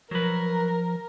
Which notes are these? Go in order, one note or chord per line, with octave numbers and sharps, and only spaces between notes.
F3 F#3 A#4 B4